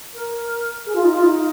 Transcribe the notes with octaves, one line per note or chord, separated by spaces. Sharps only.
A#4
G#4
F4
D#4
F4
D#4